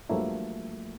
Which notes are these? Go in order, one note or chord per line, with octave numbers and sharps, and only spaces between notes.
G2 F3 F#3 A3 A#3 E4